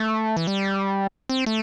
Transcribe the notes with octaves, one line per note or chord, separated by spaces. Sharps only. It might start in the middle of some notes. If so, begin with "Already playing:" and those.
Already playing: A3
E3
G3
C4
A3